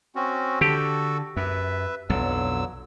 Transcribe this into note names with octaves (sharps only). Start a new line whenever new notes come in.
C4 C#4 F#4
D3 F#4 G4 A4
F#2 B4 E5
B1 F2 D3 F#3 E6